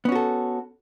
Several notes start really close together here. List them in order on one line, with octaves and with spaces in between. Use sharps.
B3 C#4 F#4 A4